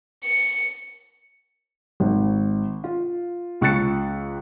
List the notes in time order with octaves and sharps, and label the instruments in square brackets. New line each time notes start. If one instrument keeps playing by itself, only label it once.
[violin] C#7
[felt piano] G#1
F4
C#2 C#6 F#6 A6 C#7